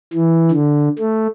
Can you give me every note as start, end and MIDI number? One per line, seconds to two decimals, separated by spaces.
0.13 0.51 52
0.51 0.89 50
0.99 1.28 57